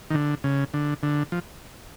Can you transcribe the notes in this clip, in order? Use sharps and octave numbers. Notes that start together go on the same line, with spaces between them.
D#3
D3
C#3
D3
D3
F3